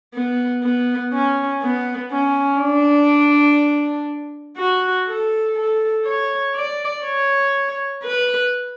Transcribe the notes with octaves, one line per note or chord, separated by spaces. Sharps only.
B3
B3
C#4
B3
C#4
D4
F#4
A4
A4
C#5
D5
C#5
B4